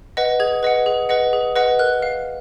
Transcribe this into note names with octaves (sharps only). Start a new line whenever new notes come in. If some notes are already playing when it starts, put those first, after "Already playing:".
B4 D#5 F#5
G#4 G#6
B4 D#5 F#5
G#4
B4 D#5 F#5
G#4
B4 D#5 F#5
A#4 F#6
F5